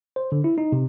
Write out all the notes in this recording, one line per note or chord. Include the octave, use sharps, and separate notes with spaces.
C5
D3
E4
D#4
C3